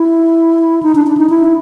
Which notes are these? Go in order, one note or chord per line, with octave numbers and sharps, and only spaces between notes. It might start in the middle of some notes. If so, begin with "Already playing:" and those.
Already playing: E4
D#4
D4
D4
D#4
E4